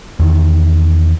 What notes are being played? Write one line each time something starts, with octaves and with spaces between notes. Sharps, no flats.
E2 D#3